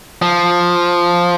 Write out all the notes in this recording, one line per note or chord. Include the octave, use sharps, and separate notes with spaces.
F3